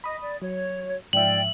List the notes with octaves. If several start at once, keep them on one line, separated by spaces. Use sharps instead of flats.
D#5 B5 D#6
D5
F#3 C#5
G#2 F3 F4 D5 E5 G5 F#7